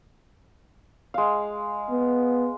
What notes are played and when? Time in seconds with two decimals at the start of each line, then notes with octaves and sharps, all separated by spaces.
1.14 G#3 F5
1.90 B3